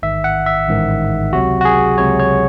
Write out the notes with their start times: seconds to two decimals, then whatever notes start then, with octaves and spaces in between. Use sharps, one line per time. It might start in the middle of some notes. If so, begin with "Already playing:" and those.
0.03 A1 G#2 D#3 E5
0.24 F#5
0.46 E5
0.68 A1 G#2 D#3
1.33 C#2 C3 F#3 F#4
1.61 F#4
1.65 G#4
1.98 C#2 C3 F#3 C#5
2.19 C#5